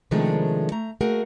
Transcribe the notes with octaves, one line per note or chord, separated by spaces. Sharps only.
C3 D#3 F3 G#3 A3 D4
A3 A#5
A3 A#3 F#4 G#4 A#4 F#5